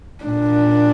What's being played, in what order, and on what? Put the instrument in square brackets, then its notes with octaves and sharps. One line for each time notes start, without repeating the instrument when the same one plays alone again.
[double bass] A#2 [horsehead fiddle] D4